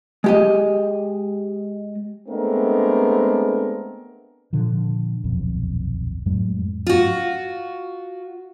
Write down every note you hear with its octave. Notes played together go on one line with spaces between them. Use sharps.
G#3 G4 D#5
G#3 A3 B3 C4 D4 A#4
A#2 D3 F3
D#1 B1 F2
F2 A2 F#3 G#3
F4 F#4